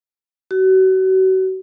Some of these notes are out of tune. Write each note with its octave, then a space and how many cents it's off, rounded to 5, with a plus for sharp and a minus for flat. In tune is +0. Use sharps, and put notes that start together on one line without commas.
F#4 +35